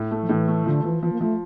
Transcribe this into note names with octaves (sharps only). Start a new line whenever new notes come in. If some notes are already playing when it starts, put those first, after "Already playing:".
Already playing: A2
A3
F3
A2 E3
A3
D3 F3
E3 F3
E3 F3
A#3
F3 A3